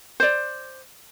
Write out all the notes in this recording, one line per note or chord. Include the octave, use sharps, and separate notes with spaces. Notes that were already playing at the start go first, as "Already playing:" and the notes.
C5 D5